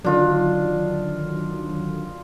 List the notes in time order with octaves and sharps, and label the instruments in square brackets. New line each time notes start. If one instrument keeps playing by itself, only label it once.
[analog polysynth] D3 D#3 F#3 [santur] D4 F4 D#5